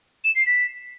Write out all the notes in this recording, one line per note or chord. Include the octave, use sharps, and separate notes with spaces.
E7
C7
B6